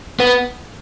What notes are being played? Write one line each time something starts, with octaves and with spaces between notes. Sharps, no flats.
B3